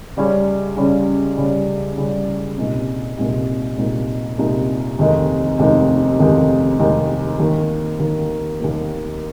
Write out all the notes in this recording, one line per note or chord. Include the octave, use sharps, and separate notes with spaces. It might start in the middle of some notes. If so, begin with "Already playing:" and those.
C#2 C#3 G3 C#4
C#2 C#3 G3 C#4
C#2 C#3 G3 C#4
C#2 C#3 G3 C#4
C2 A#2 G#3 D#4
C2 A#2 G#3 D#4
C2 A#2 G#3 D#4
C2 A#2 G#3 D#4
F1 D#2 D#3 G#3 D#4
F1 D#2 D#3 G#3 D#4
F1 D#2 D#3 G#3 D#4
F1 D#2 D#3 G#3 D#4
D#2 D#3 A#3
D#2 D#3 A#3
D#2 D#3 A#3